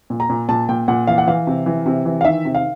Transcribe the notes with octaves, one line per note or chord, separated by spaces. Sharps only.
A#2
A#5
A#2
A#2 A5
A#2 G5
A#2 F#5
E3 F5
F#5
E3 F5
C3
E3
C3
E3
F5
D#3 E5
C3
F5